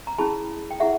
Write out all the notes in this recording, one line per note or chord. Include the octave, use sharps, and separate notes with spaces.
A#5
C#4 E4 G#4 A5 B5
G5
E4 G#4 E5 F#5